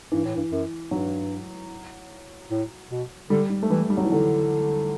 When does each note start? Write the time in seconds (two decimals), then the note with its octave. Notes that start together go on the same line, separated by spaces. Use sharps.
0.12 G2 E3
0.24 A2
0.37 G2
0.51 F#2
0.91 G2 F#3
2.51 A2
2.91 B2
3.30 D3 G3
3.50 G3
3.63 A3
3.70 E3 G3
3.90 G3
3.97 F#3
4.05 E3
4.10 D3 F#3